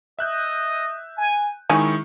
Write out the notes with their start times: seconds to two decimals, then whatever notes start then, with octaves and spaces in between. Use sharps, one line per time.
0.19 D#5 E5 F#6 G6
1.17 G#5
1.70 D#3 G#3 C#4 D#4 E4 G#5 C#6